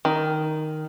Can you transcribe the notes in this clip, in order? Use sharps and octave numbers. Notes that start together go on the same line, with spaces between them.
D#3